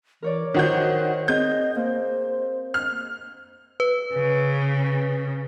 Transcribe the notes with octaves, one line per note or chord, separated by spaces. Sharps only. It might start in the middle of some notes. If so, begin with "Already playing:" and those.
E3 A#4 C#5 D5
D#3 F#4 C5 G6
C4 G#4 D#5 G6
A#3 C5
F6
B4
C#3